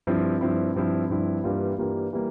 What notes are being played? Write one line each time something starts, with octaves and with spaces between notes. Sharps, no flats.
G2 F3 C4 E4
G2 F3 C4 E4
G2 F3 C4 E4
G2 F3 C4 E4
G2 E3 G3 A#3 F4
G2 E3 G3 A#3 F4
E3 G3 A#3